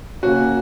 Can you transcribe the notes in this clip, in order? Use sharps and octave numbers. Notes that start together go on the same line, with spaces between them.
C#3 A#3 C#4 F#4